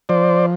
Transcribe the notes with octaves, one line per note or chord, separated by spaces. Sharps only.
F3 C5 D5